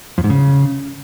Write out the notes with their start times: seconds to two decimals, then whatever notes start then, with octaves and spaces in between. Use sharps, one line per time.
0.18 F2
0.24 G#2
0.30 C#3